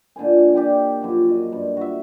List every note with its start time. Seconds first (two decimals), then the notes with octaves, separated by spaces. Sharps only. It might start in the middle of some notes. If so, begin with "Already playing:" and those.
0.16 A#2 D3 C5 G#5
0.54 G4 D5 D#5 G5
1.01 F#2 F3 F#4
1.29 D#5
1.52 G2
1.77 F#4 E5